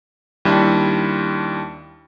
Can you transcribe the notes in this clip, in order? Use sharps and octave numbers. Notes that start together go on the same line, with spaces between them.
D#2 G3 D4 E4 E5